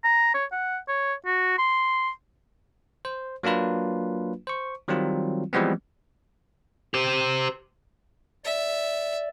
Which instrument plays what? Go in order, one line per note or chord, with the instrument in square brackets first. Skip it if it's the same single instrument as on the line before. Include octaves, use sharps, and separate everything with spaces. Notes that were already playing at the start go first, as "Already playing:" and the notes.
[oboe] A#5
C#5
F#5
C#5
F#4
C6
[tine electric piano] C5
F#3 A#3 D4 F4 B4
C5 C#6
D#3 F#3 G3 C4 F4
E3 F3 G3 G#3 B3 C4
[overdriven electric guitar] G4 C5
[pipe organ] D5 [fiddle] E5